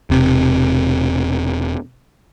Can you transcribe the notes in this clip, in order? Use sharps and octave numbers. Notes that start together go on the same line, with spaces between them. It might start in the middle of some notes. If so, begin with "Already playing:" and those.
E1 C3